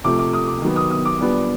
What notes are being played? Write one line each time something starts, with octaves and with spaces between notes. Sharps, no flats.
C3 F3 A3 D6
D6
D#6
D6
D#3 F#3 B3
D#6
D#6
D6
A#2 G3 B3 D4